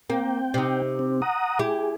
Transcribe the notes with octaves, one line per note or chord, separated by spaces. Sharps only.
A#3 C4 G5
C3 D#4
C4
F#5 A#5 D#6
E4 G4 G#4